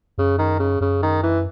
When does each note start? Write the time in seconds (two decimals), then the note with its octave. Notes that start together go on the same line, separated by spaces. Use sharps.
0.18 F#2 C#3
0.39 D#3
0.60 C#3
0.81 F#2 C#3
1.03 D#3
1.23 E3